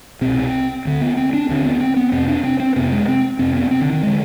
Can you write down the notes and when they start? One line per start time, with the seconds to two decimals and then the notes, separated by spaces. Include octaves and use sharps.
0.21 C2 B2 C4
0.85 D2 D3
1.01 B3
1.17 C4
1.33 D4
1.49 D#2 D3 C4
1.65 B3
1.80 C4
1.96 B3
2.12 F2 C3 C4
2.28 D4
2.44 C4
2.60 C4
2.76 F2 C3 B3
2.92 G#3
3.08 C4
3.39 F2 C3 C4
3.55 B3
3.71 C4
3.81 D3
3.92 D#3
4.03 D3 G#3